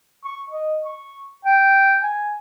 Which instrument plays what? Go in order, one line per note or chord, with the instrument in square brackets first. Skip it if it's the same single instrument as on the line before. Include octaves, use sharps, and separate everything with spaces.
[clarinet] C#6
D#5
C#6
G5
G#5